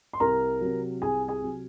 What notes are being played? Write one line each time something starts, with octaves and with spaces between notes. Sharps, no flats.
C6
C2 A#4 A#5
C3 F#3
C2 G#4 G#5
G#4 G#5
C3 F#3